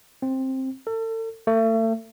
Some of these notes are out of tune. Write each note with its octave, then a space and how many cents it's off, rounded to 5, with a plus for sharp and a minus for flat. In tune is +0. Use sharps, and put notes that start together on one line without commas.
C4 +10
A4 +40
A3 +35